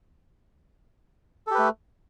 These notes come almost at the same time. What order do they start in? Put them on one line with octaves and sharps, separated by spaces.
A4 G4 B4 A3